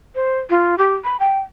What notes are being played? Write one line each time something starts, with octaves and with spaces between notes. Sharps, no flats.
C5
F4
G4
B5
G5